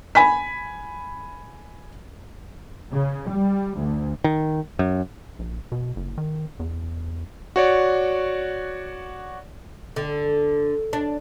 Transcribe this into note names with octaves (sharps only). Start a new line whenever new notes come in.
G#5 B5 B6
C#3
G3
D2
D#3
F#2
A#1
B2
F#1
D#3
E2
F#4 C#5 D5
D3
D4